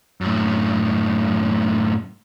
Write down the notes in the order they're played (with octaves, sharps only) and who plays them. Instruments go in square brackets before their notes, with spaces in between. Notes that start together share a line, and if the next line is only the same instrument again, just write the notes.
[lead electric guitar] F#2 A2